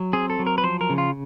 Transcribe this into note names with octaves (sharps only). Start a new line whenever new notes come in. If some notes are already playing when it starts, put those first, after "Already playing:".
Already playing: F#3
C4 G#4
A4
F#3
A#4
B4
F3 C5
A#4
C#3
F4